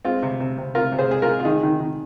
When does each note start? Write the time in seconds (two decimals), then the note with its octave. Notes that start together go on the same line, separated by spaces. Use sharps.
0.05 G#3 C4 F4
0.23 C3
0.40 C3
0.58 C3
0.75 C3 F4 A#4
0.92 C3
0.98 G#4 C5
1.10 G#3 G#4
1.22 F4 A#4
1.27 G#3
1.40 F4
1.45 D#3 D#4 G#4
1.63 D#3
1.80 D#3